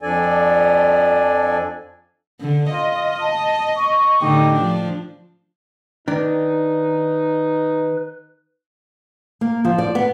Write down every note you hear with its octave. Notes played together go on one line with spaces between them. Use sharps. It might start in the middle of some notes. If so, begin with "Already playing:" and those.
F2 F3 D4 A4 D5 G#5
D3
F4 D#5
A5
C#6
A2 D3 D#4 G4
F3 D4
D#3 D4 D#4 B4
A#3
F3
D5
B3